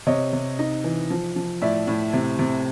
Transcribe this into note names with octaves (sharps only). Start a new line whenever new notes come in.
C3 C#5 D#5
C3
D#4
E3
F3
F3
A2 D5 E5
A2
C3
C3